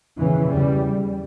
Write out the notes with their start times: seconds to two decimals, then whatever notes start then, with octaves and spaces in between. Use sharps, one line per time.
0.19 E2 C#3 E3
0.52 E2 C#3 G3